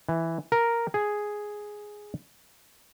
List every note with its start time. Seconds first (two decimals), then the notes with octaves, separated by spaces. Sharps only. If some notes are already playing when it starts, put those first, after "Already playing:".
0.09 E3
0.52 A#4
0.94 G#4